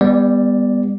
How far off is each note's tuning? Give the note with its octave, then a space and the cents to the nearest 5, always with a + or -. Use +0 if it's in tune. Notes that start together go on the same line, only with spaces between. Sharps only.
G3 +35 B3 +0 D5 +0